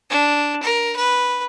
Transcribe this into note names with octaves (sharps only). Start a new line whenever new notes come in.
D4
A#4
B4